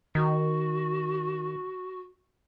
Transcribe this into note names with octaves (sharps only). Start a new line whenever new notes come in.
D#3 F#4